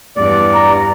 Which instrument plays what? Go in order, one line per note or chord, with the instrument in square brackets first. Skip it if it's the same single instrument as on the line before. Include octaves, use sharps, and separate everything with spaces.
[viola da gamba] E2 G2 [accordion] D5
[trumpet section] A#5